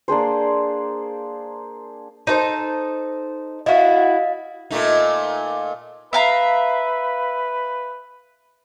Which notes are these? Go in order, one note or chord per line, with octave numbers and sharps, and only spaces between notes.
A#3 D4 G#4 C5
D#4 A4 C5
E4 F#4 D#5 F5
A#2 A3 D#4
B4 E5 F5 A#5